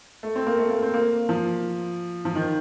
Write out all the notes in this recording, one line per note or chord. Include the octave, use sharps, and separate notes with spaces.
A3
C4
A#3
A3
A#3
C4
A#3
F3
F3
D#3